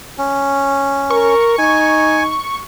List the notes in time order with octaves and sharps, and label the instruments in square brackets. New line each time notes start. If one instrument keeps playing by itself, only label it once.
[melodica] C#4
[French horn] A#4 [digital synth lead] C#6
[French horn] D#4 [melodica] G#5